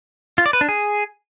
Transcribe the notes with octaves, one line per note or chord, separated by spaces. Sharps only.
F4
D5
B4
D4
G#4